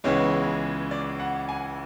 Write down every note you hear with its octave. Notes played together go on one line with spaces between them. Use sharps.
C#2 C#3 E3 G#3 B3 C#5
D5
F#5
G#5